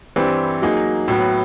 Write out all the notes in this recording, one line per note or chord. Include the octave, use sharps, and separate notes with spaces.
G2 E3 G3 C4
F#3 A#3 D#4 G#4
A2 F#3 B3